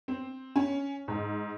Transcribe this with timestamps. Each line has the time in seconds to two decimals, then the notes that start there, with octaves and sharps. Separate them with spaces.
0.08 C4
0.56 C#4
1.08 G#2